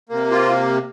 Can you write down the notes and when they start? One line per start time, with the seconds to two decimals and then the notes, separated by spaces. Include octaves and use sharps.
0.09 C3 A#3
0.31 F4